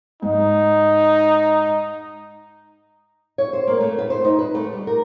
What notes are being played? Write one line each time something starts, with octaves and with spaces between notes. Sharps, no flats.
G#2 D#4
C#5
C5
A#3
A3
B4
C5
D#4
B4
A3
G3
A#4